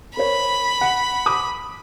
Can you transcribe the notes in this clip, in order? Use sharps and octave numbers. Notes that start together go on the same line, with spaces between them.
A#4 C5 C#5 B5
F#5
D6 D#6